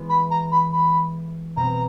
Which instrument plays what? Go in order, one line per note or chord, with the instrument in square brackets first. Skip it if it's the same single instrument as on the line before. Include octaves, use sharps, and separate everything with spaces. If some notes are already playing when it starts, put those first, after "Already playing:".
Already playing: [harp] E3 G#3 B3
[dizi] B5
A#5
B5
B5
[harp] B2 G3 C4 [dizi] A#5